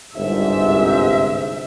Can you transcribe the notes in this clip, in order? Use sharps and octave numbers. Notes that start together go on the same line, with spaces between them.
G1 C2 G#2 E5